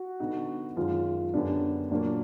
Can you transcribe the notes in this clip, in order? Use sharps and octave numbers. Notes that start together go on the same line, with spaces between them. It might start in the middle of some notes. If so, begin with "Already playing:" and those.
Already playing: F#4
D3 G3 B3 D#4 G4
F#2 D#3 G#3 F4
F#2 D3 G3 B3 D4
A#2 F#3 A#3 D4